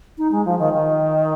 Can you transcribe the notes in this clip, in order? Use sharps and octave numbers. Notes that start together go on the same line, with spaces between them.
D#4
G#3
F3
D#3
D#3